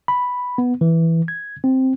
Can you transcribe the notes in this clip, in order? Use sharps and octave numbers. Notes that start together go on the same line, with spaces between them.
B5
B3
E3
G#6
C4